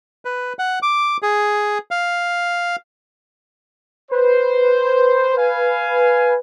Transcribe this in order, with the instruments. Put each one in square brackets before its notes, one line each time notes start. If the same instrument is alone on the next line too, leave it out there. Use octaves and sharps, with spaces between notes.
[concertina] B4
F#5
D6
G#4
F5
[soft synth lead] B4 [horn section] C5
[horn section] F5 G#5